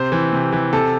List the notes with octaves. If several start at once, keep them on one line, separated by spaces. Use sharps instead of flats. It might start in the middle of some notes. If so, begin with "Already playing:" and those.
Already playing: C3 C5
E3
C3
E3
C3 A4